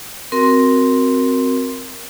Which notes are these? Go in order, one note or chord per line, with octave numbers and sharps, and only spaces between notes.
C4 F#4 A#4 C6